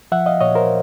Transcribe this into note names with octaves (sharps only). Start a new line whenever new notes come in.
F3 E5 F#5
D#5 F5
A#2 C#5 D#5
A#4 C5